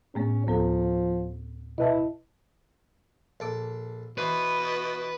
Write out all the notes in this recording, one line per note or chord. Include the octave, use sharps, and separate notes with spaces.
A2 A3 B3 C#4
D2 F3 B3 A4
B2 E4 B4 D#5 E5 A5
A#1 A4 D6
B2 E3 B4 C5